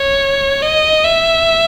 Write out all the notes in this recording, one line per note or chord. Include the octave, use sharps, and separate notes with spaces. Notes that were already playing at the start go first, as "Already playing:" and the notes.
Already playing: C#5
D#5
E5